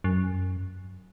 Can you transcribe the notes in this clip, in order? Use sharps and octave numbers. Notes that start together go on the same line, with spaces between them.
F#2